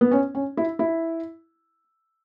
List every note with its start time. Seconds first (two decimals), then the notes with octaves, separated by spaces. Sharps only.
0.01 B3
0.11 C#4
0.35 C#4
0.57 E4
0.79 E4